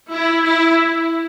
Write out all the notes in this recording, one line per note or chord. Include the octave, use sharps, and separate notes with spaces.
E4
E4